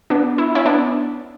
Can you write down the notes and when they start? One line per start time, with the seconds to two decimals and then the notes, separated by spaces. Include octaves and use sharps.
0.10 B3 D4
0.38 E4
0.55 C#4 E4
0.65 B3 D4